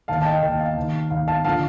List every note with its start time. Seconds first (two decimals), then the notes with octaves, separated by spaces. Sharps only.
0.08 D#2 D#3 F5 A5
0.22 A5
0.25 D#5 G5
0.42 D#2 D#3 D#5 G5
0.59 F5
0.77 D#2 D#3
1.10 D#2 D#3 F5
1.28 F5 A5
1.45 D3 F3 F5 A5